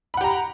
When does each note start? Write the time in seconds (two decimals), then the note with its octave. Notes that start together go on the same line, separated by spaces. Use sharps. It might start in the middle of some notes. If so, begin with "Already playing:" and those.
0.14 B5
0.17 F#5
0.21 G4
0.24 A#5